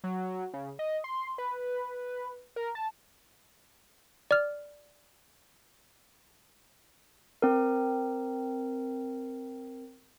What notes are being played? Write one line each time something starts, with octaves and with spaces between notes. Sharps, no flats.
F#3
C#3
D#5
C6
B4
A#4
A5
D5 F6
C4 A#4